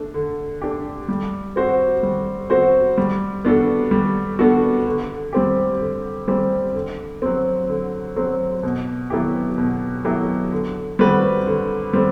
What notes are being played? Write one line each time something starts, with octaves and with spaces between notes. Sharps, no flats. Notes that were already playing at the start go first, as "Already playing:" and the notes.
Already playing: A3 D4
D3
A3 D4 G4
G3
C4 F#4 C5
G3
C4 F#4 C5
G3
B3 D4 F#4 A4
G3
B3 D4 F#4 A4
D3
G3 C4 G4
D3
G3 C4 G4
D3
F#3 C4
D3
F#3 C4
B2
F#3 B3 E4 G4
B2
F#3 B3 E4 G4
D3
G3 C4 F#4 B4
D3
G3 C4